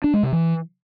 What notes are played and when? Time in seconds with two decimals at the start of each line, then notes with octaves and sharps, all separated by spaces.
0.04 D4
0.14 G#3
0.23 C3
0.33 E3